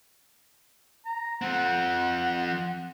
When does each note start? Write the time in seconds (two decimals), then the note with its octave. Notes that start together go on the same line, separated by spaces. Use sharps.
1.05 A#5
1.42 F3 C4 F#5